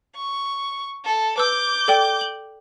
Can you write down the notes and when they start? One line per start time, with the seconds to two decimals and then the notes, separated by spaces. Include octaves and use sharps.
0.16 C#6
1.05 A4
1.38 B4 D6 E6 G6
1.88 A4 D5 G5
2.21 F#7